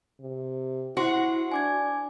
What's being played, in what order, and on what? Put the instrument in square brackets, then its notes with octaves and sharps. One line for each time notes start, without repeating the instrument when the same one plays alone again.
[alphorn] C3
[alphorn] E4 [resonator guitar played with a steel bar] F#4 [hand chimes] C5 F#5 C6
[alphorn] D4 [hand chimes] G#5 D6 G#6